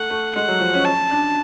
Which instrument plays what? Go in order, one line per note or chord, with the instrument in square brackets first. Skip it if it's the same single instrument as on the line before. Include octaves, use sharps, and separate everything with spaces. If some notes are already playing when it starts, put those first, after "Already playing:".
Already playing: [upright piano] A3 [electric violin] F#5
[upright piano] A3
[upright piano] G#3 [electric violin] F#5
[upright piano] F#3
F3
C#4
[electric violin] A5
[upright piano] D4